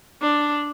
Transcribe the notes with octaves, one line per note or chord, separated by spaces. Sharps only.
D4